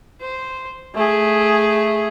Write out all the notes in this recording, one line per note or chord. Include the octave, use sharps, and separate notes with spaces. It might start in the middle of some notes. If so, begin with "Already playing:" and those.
C5
A3 G#4